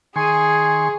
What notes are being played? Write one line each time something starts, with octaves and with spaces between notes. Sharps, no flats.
D#3 G#4 G#5 C6 C#6